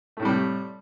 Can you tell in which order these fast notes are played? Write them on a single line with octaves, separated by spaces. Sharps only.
A3 A2 C3 G3